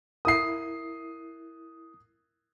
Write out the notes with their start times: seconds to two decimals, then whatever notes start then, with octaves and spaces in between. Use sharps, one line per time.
0.25 E4 A#4 D#6 C7